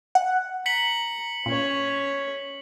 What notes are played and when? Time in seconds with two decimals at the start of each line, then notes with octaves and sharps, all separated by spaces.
0.15 F#5
0.66 A#5 B6 C#7 F#7
1.46 A#2 C#4 C#5